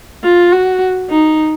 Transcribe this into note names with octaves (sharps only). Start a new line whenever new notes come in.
F4
F#4
D#4